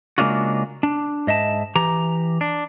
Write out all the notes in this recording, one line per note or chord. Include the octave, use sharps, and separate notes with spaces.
C#3 G#3 A#3 D4 F4 F#4
D4
G#2 D#5 E5 A5
E3 G4 A#5
D4